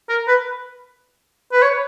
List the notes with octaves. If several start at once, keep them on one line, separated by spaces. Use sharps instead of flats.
A#4
B4
B4
C#5